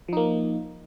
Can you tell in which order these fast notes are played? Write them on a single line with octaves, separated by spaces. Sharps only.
F3 D#4 A#3